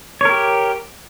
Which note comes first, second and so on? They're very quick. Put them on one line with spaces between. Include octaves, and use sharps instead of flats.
C#5 A#4 G4